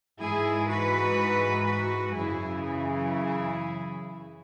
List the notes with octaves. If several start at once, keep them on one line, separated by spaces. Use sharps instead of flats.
G#2 E3 E4 G#4
F#4 B4
F#4 B4
F#2 C#3 E3 E4 G#4
E4 G#4